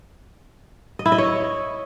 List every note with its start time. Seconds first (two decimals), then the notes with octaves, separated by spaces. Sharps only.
0.99 D#5
1.06 E4
1.12 D#5
1.18 C#5